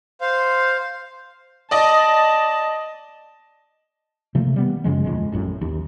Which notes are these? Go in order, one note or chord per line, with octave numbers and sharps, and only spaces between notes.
C5 F5
D5 D#5 A5
C3 F3 A3 A#3
D#3 G3 B3
F#2 C#3 F3 G#3
D#1 F2 G#3
A1 F#2 A2
D#2